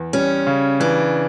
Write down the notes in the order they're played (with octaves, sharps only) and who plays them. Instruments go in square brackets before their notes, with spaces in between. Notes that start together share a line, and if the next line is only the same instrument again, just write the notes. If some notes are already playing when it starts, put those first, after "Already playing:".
Already playing: [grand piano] E2
[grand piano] G3 [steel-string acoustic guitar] C#4
[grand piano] C#3
[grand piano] E3 [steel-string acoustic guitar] D4